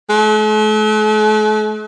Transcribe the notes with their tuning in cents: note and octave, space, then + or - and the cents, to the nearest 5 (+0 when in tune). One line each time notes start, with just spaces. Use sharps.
A3 -45